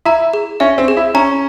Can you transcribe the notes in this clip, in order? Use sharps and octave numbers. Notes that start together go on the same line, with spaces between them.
E4 A#5
G#4
C#4 E5
C4
G#4
E4
C#4 A#5